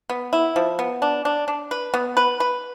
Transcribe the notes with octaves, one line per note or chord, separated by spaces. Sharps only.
B3
E4
F3
B3
D4
D4
D4
B4
B3
B4
B4